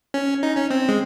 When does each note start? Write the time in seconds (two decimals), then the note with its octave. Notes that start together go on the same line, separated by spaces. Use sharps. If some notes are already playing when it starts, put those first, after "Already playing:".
0.14 C#4
0.43 D#4
0.56 C#4
0.71 C4
0.89 G#3